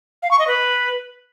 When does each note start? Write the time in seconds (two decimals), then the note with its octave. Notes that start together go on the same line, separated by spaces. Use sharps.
0.22 F5
0.31 C#6
0.39 D#5
0.47 B4